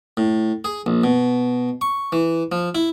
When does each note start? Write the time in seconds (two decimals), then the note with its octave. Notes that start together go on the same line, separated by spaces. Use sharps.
0.17 A2
0.64 G#4
0.86 A#1
1.04 B2
1.81 C#6
2.12 E3
2.52 F3
2.75 E4